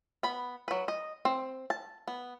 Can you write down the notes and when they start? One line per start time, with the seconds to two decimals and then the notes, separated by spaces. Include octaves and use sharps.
0.23 B3 B5
0.68 F#3 B4
0.88 D#5
1.25 C4
1.70 A5
2.08 B3